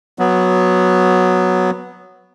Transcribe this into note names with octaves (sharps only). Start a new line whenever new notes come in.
F#3 B3